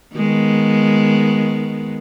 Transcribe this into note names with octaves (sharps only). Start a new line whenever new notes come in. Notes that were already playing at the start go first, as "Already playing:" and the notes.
D#3 G#3 B3